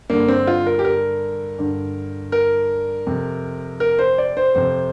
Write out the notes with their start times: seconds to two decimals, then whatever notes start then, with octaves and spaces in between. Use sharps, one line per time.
0.10 G2 D3 A#3
0.28 C4
0.47 F4
0.66 A#4
0.79 G4
0.84 A#4
1.59 G2 D3
2.32 A#4
3.07 F2 C3
3.80 A#4
3.99 C5
4.18 D5
4.37 C5
4.55 F2 C3 C5